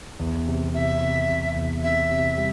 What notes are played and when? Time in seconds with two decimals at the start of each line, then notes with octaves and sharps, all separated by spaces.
0.19 E2
0.48 C3
0.74 C3 E5
1.01 C3
1.29 C3
1.56 E2
1.83 C3 E5
2.10 C3
2.38 G3